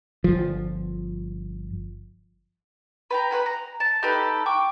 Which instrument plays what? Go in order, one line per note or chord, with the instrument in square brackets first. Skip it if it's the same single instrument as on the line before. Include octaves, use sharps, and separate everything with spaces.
[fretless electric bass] G1 F3
[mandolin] B4 G5 A#5
B4 C5 F#5 G#5
A#5
A5
D#4 G4 A4 B4
G5 C#6 D6